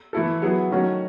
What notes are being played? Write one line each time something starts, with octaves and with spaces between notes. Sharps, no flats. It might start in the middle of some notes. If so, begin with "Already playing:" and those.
E3 A3 E4 A4
F#3 B3 E4 G#4
D#3 F#3 A3 C#4 F#4